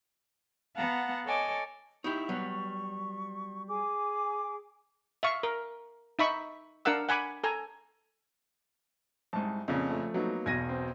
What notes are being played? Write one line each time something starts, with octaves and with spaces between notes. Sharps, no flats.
B3 F5 F#5 A5 A#5
A4 C#5 D#5 G#5 D6
D#4 E4 G4 C#6
F#3 G3 B3
G#4 G#5 D6
E5 F5 C#6
A#4
D#4 E5 B5 C#6
D4 A#4 F5 F#5 E6
F#5 G#5 B5 D6
A4 G#5 A#5
C2 G#2 A5
F2 A#2 C#3
F3 A3
F#3 A#3 B3 D#4
B1 E2 B2 G#6 A#6 D#7
C4